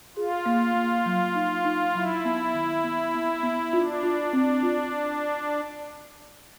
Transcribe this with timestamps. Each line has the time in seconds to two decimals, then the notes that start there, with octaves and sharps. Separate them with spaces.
0.16 F4 G#4
0.46 A#3
0.75 A#3
1.06 F#3
1.35 D#4
1.65 D#4
1.95 F#3 E4
2.25 B3
2.54 D#3
2.84 B3
3.14 B3
3.43 B3
3.73 D4 F4
4.03 F4
4.33 C4
4.62 F4